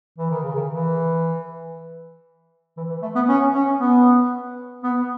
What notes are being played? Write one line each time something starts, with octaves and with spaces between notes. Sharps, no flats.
E3
D#3
C#3
D#3
E3
E3
E3
A3
B3
C#4
C#4
B3
B3